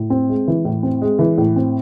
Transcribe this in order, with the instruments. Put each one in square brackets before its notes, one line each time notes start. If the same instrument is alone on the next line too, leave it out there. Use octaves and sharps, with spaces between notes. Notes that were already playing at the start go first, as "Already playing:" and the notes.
Already playing: [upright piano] A2
C4
G#3
E3
A2
C4
G#3
E3
A2
C4